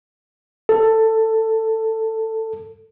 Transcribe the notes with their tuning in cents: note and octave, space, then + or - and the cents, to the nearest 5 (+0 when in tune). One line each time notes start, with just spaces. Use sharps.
A4 +15